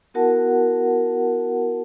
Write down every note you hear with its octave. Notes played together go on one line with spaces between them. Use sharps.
B3 E4 F#4 A#4 F#5 A5